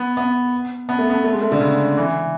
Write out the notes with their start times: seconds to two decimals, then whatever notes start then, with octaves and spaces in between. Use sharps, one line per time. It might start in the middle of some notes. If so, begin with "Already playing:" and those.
Already playing: B3
0.17 B3
0.89 B3
0.99 A3
1.10 B3
1.24 A3
1.33 G#3
1.42 A3
1.52 D3
1.60 C#3
1.97 E3